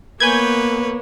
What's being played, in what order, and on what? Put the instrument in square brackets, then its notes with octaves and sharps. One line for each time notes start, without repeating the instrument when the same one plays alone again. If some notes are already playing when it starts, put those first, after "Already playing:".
[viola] A#3 B3 [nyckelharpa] B4 C#5 [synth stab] G#5 G6 G#6